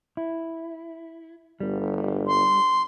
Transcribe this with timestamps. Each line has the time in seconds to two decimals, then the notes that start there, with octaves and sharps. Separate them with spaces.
0.17 E4
1.60 G1 G3
2.27 C6